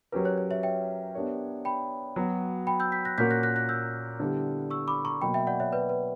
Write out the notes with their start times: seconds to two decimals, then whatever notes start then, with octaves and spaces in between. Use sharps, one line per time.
0.12 F#3 C#4 G4 A#4 B4
0.25 C#5
0.38 C#5
0.51 C#5 E5
0.63 E5 G5
1.15 B3 D4 G4 A#4 C#5
1.65 G5 B5
2.16 F#3 B3 F#4
2.67 G5 B5
2.80 E6 G6
2.92 G6 B6
3.05 F#6 A#6
3.18 A#2 A#3 C#4 F#4 A#4 G6 B6
3.31 F#6 A#6
3.43 F#6 A#6
3.56 F#6 A#6
3.69 E6 G6
4.20 D3 G3 B3 E4 G4
4.71 C#6 E6
4.87 B5 D6
5.05 A#5 C#6
5.21 B2 F#3 A#3 G5 B5
5.34 E5 G5
5.47 D5 F#5
5.60 C#5 E5
5.73 B4 D5
5.89 B4